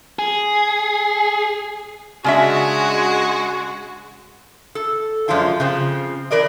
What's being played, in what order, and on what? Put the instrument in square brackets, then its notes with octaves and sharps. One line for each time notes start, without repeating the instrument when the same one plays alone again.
[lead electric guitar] G#4
[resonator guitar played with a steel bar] C#3 D4 E5 [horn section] G#3 F#4
[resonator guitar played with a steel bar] A4
F#2 F3 G#3 D4 F4 A5
C#3 F3 C4
E3 A#4 D5 D#5